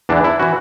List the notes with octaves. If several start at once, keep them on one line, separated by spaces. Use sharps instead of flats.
E2 E3 D4
E4
E3 F#4